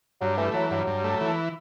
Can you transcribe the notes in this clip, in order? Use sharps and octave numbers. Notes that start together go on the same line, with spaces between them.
G2 F#3
E3 A3
E3 F#3
G2 F#3
G2
A3
E3